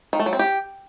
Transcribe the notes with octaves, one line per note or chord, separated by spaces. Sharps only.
D#3
A3
F#3
C4
G4